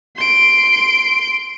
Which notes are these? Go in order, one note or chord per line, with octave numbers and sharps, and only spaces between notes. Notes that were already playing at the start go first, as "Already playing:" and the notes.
C6 D7